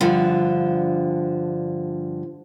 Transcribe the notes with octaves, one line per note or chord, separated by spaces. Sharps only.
G2 D3 F3